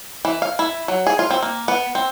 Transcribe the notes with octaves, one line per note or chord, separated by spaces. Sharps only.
E3
F5
E4
F#3
G#4
F4
C4
A#3
B3
C4